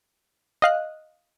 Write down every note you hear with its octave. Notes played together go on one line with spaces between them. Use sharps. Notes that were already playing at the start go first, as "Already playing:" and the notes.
D#5 F5 F#6